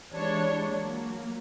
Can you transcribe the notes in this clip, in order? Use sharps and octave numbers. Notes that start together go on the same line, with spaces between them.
E3 G3 G#3 D4 C#5
F#3 A#3